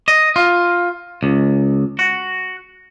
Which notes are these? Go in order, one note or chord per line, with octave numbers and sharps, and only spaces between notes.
D#5
F4
C#2
F#4